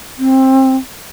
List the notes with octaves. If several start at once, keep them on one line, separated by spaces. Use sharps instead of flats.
C4